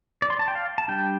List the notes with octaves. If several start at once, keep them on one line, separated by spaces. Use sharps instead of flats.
D5
C6
A5
G5
F5
A5
G3 D4 G5